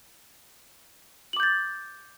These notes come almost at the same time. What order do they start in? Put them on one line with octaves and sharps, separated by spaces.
F#7 D6 G6 A6